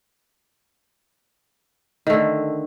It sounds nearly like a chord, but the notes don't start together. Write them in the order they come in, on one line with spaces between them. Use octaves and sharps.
D#3 A3 D3